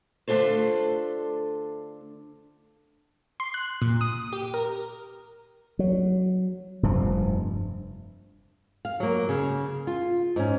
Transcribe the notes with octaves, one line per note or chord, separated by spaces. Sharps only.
D3 A3 D4 F4 A4 C5
C6
F#6
A#2
D#6
G4
A#4
F#3
F1 G2 F3
F5
F#3 A#3
C#3
F4
G#2 C#4